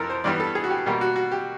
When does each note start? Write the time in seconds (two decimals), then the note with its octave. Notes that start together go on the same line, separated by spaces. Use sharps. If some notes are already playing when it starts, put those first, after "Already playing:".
Already playing: F2 C3 E3 A4 A#4
0.10 C5
0.24 G2 E3 G3 B3 D5
0.40 A4
0.55 G#4
0.64 F#4
0.70 G4
0.86 B2 G3 A#3 G4
1.01 F#4
1.16 F#4
1.31 G4